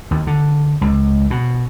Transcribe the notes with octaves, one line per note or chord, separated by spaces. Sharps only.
D#2
D3
C#2
B2